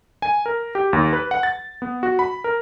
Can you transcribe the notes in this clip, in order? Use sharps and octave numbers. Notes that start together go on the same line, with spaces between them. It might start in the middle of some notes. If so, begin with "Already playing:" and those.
G#5
A#4
G4
D#2
B4
F#5
A6
B3
F#4
B5
A#4